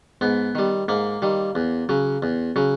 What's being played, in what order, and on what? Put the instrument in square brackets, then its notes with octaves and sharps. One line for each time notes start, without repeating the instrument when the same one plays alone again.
[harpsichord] G#2 B3
D#3 G3
G#2 A#3
D#3 G3
E2
C#3 F#3
E2
C#3 F#3